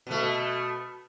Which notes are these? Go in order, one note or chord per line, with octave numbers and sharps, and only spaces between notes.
B2 A3